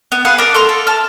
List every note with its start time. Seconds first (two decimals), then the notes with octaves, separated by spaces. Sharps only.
0.12 B3
0.25 G#4 B4 F5 F#5
0.38 D4 A#4
0.54 A4 C6 F6
0.69 A4
0.87 A5 F6